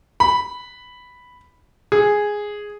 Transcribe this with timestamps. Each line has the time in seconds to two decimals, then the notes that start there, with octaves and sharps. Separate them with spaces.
0.20 B5
1.92 G#4